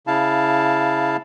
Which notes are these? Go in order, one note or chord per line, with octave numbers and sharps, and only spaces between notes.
C#3 E4 F5 A5